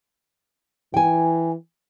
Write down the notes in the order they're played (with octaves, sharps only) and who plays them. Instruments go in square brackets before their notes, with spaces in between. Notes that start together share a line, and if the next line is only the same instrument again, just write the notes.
[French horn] E3 [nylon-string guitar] G5 G#5